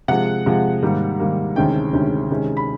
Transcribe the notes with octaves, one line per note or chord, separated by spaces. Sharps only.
C3 F3 G#3 F#5
C3 F3 G#3
G#2 D#3 G3 A#3
G#2 D#3 G3 A#3
D2 C3 D#3 G#3 C#4 G5
D2 C3 D#3 G#3 C#4
C3 D#3 G#3 C#4
B5